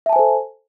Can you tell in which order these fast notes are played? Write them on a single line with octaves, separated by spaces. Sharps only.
E5 A5 G#5 C5 A4